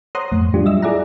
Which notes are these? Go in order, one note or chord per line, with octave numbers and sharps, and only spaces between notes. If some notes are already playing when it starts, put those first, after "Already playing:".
C5 C#5 F#5 A#5 C6 D#6
F2 A2
F#3 G3 D4 F4 G4
D#5 E5 E6
E4 G#4 D5 E5 F#5 A#5